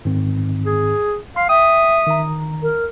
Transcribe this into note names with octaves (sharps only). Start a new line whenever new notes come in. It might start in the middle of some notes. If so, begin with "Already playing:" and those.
G#2 D#3 C4
G#4
F5 C6
E5 G5 D#6
D#3 A#5
A#4